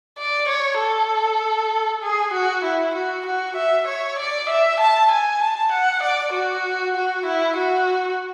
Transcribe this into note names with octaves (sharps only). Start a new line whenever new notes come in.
D5
C#5
A4
G#4
F#4
E4
F#4
F#4
E5
C#5
D5
E5
A5
G#5
A5
F#5
D5
F#4
F#4
E4
F#4